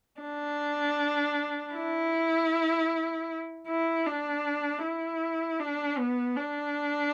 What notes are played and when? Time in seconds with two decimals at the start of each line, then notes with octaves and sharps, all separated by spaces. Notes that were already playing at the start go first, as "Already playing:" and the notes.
0.21 D4
1.75 E4
3.68 E4
4.06 D4
4.83 E4
5.60 D4
5.98 B3
6.37 D4